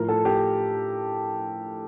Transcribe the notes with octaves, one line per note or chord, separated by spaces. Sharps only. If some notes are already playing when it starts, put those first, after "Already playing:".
Already playing: A2 F3 A#4
A4
G4